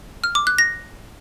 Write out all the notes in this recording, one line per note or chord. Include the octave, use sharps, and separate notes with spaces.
F6
D6
F#6
A#6